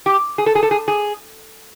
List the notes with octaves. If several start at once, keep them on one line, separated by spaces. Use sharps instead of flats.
G4
G#4
A4
G#4
A4
G#4
G#4